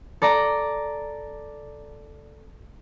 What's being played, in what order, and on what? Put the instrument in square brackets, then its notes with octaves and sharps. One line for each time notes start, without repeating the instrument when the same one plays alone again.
[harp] A4 D5 A#5